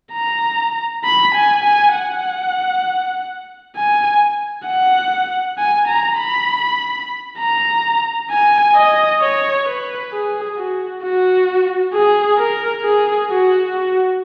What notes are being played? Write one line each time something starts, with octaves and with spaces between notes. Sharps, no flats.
A#5
B5
G#5
G#5
F#5
G#5
F#5
G#5
A#5
B5
A#5
G#5
D#5
C#5
B4
G#4
F#4
F#4
G#4
A#4
G#4
F#4
F#4